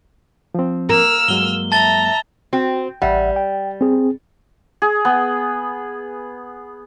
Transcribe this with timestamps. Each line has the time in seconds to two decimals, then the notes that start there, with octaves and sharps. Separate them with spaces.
0.55 F3 C4
0.89 A#3 E6 F6
1.28 G2 F#3 G#3 G7
1.72 E5 A5 A#5 A6 G7
2.53 C4 F#4
3.02 A1 G3 E5 F#5
3.36 G5
3.81 C4 G#4
4.82 G#4
5.05 B3